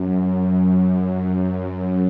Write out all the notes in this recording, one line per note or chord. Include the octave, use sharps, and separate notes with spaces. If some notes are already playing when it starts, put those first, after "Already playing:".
Already playing: F#2
F#2